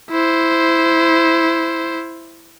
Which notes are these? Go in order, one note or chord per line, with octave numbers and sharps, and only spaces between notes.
E4 C5